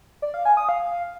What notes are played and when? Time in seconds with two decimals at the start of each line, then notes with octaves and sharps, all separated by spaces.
0.22 D5
0.34 F5
0.45 G#5
0.57 D#6
0.69 F5